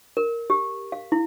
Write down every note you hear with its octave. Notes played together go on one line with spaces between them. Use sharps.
A#4
G4
F5
E4